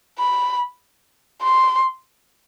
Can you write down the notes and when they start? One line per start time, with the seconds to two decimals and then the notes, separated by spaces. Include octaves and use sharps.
0.19 B5
1.42 C6